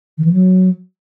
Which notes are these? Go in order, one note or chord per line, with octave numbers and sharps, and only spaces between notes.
D#3
E3
F#3